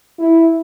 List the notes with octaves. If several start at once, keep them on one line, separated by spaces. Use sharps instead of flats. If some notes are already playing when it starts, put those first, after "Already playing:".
E4